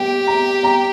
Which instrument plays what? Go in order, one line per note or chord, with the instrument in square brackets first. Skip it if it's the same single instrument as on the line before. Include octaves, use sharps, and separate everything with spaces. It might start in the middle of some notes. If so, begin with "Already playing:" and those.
Already playing: [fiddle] G4 [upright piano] G5
[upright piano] A#5
A#5